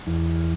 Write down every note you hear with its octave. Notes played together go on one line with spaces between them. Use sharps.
E2